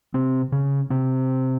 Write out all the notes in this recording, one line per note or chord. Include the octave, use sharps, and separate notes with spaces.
C3 C4
C#3 C#4
C3 C4